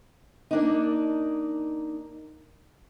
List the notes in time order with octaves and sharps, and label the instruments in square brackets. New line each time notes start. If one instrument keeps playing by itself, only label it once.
[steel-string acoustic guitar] A#3 D4 D#4